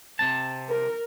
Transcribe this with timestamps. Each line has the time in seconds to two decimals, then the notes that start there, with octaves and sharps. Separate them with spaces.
0.19 C3 C4 A5
0.69 A#4